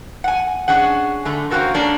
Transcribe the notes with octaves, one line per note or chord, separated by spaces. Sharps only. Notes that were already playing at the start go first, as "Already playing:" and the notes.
F#5 G#5
C#4 D4 G#4 F#5
D3 A3
A#3 C4 C#4 F#4 A4 A#4
A#3 C#4 D4 A4